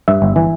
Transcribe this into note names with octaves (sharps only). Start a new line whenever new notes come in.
G2 E5
G1
E3